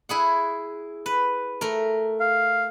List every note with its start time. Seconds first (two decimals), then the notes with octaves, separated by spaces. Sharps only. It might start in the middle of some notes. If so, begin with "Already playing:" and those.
0.09 E4 G#4 F#5
1.06 B4
1.61 A3 A#4
2.20 F5